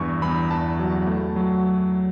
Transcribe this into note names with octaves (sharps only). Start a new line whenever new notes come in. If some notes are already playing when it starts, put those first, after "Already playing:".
Already playing: E2 G2 C#6
E2 B5
E2 A5
F#3
A3
F#3